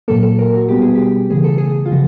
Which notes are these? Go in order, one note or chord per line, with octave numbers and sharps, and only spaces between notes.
A#2 F#3 A#3 A4
A4
A#4
F#4
B2 G3 B3 G4
G#4
G4
C#3 E3 A3 G#4
A4
G#4
F4
C#3 F3 F#4